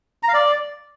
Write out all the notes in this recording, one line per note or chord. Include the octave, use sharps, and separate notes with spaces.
A#5
F5
D5